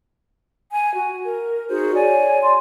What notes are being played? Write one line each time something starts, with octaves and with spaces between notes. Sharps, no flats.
G#5
F#4
A#4
D#4 F#4 G#4 C5
C#5 D5 G#5
D5 C6